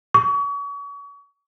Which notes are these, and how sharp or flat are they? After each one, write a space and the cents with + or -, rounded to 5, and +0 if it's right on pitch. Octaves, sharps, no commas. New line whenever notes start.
C#6 +40